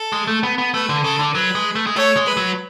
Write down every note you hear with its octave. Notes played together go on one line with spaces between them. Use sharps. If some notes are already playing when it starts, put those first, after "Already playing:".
Already playing: A4
G#3
A3
B3
B3
A3 B4
D3
C#3 A4
D3
F#3 B4
G#3
A3
G#3
A3 C#5
G#3
B4
F#3